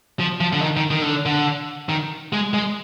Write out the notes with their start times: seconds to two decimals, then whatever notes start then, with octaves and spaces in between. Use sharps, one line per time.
0.20 F3
0.40 F3
0.53 D3
0.62 D#3
0.77 D#3
0.91 D#3
1.02 D3
1.26 D3
1.89 D#3
2.33 G#3
2.54 G#3